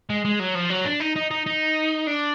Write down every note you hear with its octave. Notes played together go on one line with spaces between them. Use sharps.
G#3
G#3
F#3
F3
F#3
D4
D#4
D#4
D#4
D#4
D4